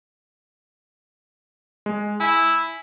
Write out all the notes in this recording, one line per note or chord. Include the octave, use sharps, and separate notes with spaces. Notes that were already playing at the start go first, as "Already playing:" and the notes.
G#3
E4 G#5